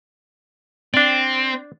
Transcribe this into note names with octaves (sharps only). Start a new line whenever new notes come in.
C4 D4 D5